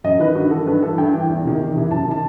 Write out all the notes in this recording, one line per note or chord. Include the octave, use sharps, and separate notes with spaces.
F#2 D#5
D#3 B4
G2 F#4
D#3 A4
G2 B4
E3 A4
G2 G5
E3 G5
E2
C3 D#3
E2
C3 E3
F#2 A5
D#3 A5